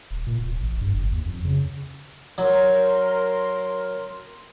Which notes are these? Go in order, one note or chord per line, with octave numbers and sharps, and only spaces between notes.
D#1
A#2
D1
A1
G2
F#1
D#2
F2
C#3
F#3 A#4 C6